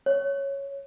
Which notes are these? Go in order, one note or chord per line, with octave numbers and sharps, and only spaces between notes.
C#5